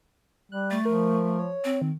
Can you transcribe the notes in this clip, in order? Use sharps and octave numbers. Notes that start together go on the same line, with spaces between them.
G3 F#6
A3 A6
F3 A#4
C#5
C4
D#3